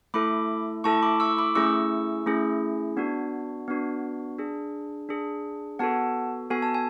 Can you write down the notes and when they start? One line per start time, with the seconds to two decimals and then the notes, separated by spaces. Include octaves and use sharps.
0.14 A3 E4 A4 B5 D6
0.84 A3 E4 A4 A5 C#6
1.02 B5 D6
1.20 C#6 E6
1.38 B5 D6
1.55 A3 C#4 E4 G#4 C#6 E6
2.26 A3 C#4 E4 G#4
2.97 B3 D4 F#4
3.68 B3 D4 F#4
4.38 D4 G#4
5.09 D4 G#4
5.79 B3 F#4 A4 F#5 A5
6.50 B3 F#4 A4 G#5
6.62 A5
6.74 G#5